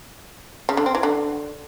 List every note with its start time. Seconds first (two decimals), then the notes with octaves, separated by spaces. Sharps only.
0.69 C#3
0.77 D3
0.86 C4
0.95 E3
1.03 D3